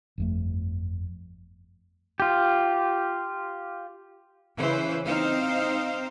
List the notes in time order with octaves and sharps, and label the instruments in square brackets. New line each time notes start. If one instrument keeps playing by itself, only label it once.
[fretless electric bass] G1 F2 A3
[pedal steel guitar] F4 G4
[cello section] C#3 E3 B4 C5
C4 D#4 C5 F5